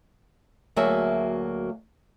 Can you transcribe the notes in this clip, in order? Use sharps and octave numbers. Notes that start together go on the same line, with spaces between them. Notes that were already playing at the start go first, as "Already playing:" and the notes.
D2 F#3 A#3 G#4 E5